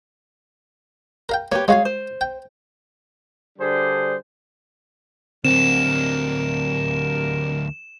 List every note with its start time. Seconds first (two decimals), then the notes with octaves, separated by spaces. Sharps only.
1.29 A#4 F5 G5
1.52 A#3 G4 B4 C#5
1.68 G#3 F#4 G#4 C#5 F5 G#5
1.85 C5
2.21 G5
3.59 D3 G3 D4 G#4 C5
5.45 D2 G2 F#3 G3 C4 A#4 E7